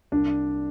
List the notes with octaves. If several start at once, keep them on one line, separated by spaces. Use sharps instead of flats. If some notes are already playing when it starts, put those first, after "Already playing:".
C2 D4